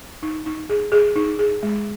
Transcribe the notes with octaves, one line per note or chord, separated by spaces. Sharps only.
D#4
D#4
G#4
G#4
D#4
G#4
G#3